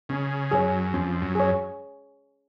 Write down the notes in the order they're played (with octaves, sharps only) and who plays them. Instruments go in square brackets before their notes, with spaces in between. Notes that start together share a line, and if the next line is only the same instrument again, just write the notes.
[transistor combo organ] C#3 [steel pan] C#4
[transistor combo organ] F#2 [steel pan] G#4 C#5
[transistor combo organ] F2 [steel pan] C#4
[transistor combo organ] F#2
[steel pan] G#4 C#5